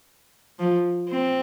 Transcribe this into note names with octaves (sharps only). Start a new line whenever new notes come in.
F3
C4